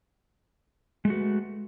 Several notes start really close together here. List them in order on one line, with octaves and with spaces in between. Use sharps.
G#3 A3 F#4 B4